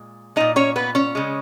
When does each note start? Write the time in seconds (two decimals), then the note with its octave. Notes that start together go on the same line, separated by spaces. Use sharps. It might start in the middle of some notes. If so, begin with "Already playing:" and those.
Already playing: A#2 G#3
0.36 A#2 G#3 D#4 D#5
0.56 C#4 C#5
0.76 B3 B4
0.95 C#4 C#5
1.15 C#3 G#3